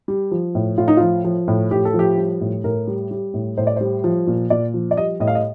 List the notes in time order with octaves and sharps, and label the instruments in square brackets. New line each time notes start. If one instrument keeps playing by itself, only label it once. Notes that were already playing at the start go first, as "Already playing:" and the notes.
[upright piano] G3
F3
A2
A2 F4
D#4
F3 F4
F3
A2
A2 G4
A4
F3
G4
G3
A2
A2 A#4
G3
G3
A2
A2 C5
D5
G3 C5
F3
A#2
A#2 D5
F3
D5
G3 D#5
A2 D#5
F5
D#5